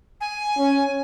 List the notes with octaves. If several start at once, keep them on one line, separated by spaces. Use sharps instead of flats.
G#5
C#4